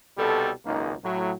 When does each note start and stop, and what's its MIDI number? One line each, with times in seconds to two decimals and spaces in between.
0.17 0.50 36
0.17 0.50 47
0.17 0.50 55
0.17 0.50 69
0.64 0.93 32
0.64 0.93 37
0.64 0.93 42
0.64 0.93 58
0.64 0.93 63
1.03 1.32 45
1.03 1.32 54